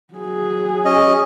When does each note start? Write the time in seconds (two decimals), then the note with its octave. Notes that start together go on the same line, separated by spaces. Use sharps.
0.14 F#3 G#4
0.85 C#4 D#5